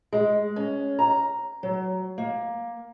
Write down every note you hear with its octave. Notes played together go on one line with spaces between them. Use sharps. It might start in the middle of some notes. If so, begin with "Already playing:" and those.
G#3
C#4
A#5
F#3
A#3